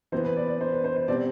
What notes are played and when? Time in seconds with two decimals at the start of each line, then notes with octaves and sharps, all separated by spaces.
0.12 E3 B3 C5
0.25 B4
0.36 D5
0.48 D5
0.61 C5
0.73 B4
0.84 C5
0.96 C5
1.08 B2 G3 C4 D5